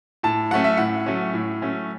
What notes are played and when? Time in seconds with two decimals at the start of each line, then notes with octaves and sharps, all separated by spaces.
0.23 A2 A5
0.51 F#3 A3 C#4 F#5
0.64 E5
0.77 A2 F#5
1.06 F#3 A3 C#4
1.34 A2
1.62 F#3 A3 C#4